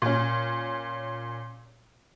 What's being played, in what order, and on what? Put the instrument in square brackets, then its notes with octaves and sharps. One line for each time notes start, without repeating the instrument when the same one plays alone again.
[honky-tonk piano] A#2 C#4